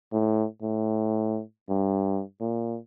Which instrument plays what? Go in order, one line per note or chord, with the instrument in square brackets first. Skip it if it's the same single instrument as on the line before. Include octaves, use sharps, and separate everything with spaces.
[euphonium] A2
A2
G2
A#2